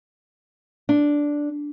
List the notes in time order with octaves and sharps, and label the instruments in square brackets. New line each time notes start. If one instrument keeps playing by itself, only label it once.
[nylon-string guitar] D4